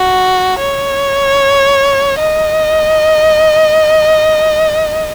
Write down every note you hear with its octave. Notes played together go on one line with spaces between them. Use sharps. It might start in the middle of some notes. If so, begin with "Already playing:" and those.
Already playing: F#4
C#5
D#5